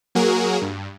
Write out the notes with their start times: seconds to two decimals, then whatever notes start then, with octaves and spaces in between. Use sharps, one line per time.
0.15 F#3 A#3 F#4 G#4 A#4
0.62 G2